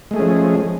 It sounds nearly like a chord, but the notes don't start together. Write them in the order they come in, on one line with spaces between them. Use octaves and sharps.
G#3 A3 G#4 C#4 F3